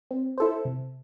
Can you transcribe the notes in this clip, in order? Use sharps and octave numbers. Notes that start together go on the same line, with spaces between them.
C4
E4 A4 C5
C3